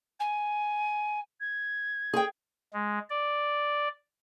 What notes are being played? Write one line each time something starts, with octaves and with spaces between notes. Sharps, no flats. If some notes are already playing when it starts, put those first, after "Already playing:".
G#5
G#6
G#4 G5
G#3
D5